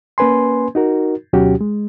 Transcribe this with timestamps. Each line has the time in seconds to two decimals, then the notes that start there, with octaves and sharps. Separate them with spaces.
0.18 A#3 C#4 B4 G#5 C6
0.75 D#4 F#4 A#4
1.33 D2 B2 F#3 C#4 F#4 G4
1.61 G#3